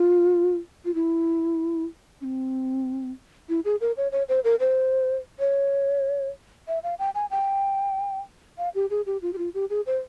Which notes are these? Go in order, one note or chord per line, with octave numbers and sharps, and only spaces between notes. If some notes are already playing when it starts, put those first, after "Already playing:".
Already playing: F4
F4
E4
C#4
C4
E4
G#4
A#4
C#5
C#5
C5
A#4
C5
C#5
E5
F5
G5
G#5
G5
F5
G4
G#4
G4
F4
G4
F4
G4
G#4
C5